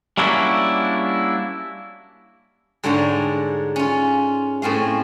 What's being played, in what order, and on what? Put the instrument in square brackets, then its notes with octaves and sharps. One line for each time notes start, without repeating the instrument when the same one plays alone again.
[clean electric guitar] G3 A#3 C#4 D4 E4 F#4
[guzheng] G#2 D3 G3 D4 C#5 A#5
C#4 F4
A2 C4 C#4 F5